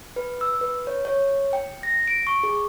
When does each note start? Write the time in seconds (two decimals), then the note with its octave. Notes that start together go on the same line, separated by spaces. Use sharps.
0.16 B4
0.41 E6
0.61 B4
0.87 C#5
1.05 C#5
1.53 G5
1.83 A#6
2.08 D7
2.27 C#6
2.43 G#4